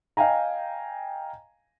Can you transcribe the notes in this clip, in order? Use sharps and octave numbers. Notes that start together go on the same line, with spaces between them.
D#5 F5 G5 G#5 A#5